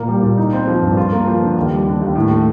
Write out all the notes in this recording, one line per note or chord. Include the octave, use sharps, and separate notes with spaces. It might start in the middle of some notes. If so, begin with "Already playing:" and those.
Already playing: A#2 A#3
G3
A#2
D#4
C4
F3
G2
F4
A#3
F3
D3
D#2
G3
D3
D#2
A2
A3